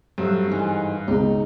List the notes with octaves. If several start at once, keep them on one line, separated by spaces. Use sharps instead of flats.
G2 F#3 A3 C4
G#2 E3 D#4
C#2 B2 D#4